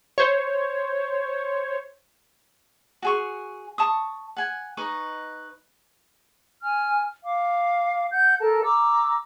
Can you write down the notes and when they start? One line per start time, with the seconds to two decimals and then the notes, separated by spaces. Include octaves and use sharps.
0.18 C5 C#5
3.02 F#4 G#4 C#6
3.78 A5 C#6 D#6
4.37 F#5 G#5
4.77 D#4 B4 D#5 C#6
6.62 G#5 F6
7.24 F5 D6
8.11 F#5 G6
8.40 A4 A#4 A5
8.62 A#5 D6 E6